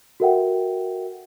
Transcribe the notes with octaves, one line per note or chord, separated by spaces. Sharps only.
F#4 A4 A#4 E5 F#5 G5